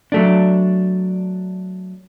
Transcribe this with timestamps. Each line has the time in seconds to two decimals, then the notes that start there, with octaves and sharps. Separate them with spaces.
0.12 F#3 A3 D4